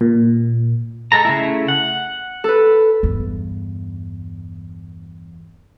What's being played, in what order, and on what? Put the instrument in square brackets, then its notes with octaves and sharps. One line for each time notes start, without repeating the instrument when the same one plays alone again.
[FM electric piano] A#2
[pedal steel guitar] G#3 A4 A#5
C#3 A3 E4
F#5
[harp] A4 B4
[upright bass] E2 G2